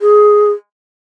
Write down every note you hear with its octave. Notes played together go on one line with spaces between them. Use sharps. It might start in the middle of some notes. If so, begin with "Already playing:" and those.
G#4